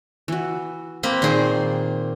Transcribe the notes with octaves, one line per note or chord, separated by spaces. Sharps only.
E3 F#4
A#3 C4 B4
A#2 D#3 D#4 G#4 C5